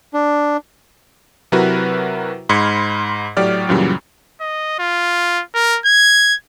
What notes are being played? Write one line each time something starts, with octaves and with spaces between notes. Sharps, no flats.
D4
C3 F#3 E4 F#4 A#4 B4
G#2 B5 C6 F6 G#6 C#7
A2 F#3 G4 D5 F6
F#2 A#2 C#3 E3 F#3 G3
D#5
F4
A#4
G#6